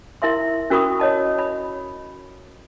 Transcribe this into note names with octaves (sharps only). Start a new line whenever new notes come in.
E4 A#4 E5 C6
C#4 F#4 A#4 B5 C#6 D#6
C#5 D#5 A5
B5